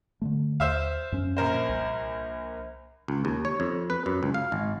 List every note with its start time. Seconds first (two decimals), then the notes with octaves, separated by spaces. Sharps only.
0.22 D3 D#3 A3
0.60 D#2 C5 E5 F5
1.12 F#2 C#4
1.37 A#1 A#4 C5
1.69 C2
3.08 C#2
3.25 D#2
3.45 C#5
3.60 F2
3.90 B4
4.06 F#2
4.23 C#2
4.34 F5
4.52 G#1